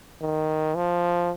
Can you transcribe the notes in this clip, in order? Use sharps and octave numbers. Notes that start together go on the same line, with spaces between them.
D#3
F3